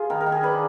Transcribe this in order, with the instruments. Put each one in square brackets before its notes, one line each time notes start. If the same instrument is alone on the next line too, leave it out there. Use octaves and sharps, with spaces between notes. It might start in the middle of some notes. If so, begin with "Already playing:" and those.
Already playing: [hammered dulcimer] F4 G#4
D#3 A#4
A#4
D#3
G#4
D4 B4